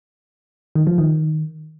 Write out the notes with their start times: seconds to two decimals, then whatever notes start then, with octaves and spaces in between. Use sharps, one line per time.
0.75 D#3
0.87 F3
0.98 D#3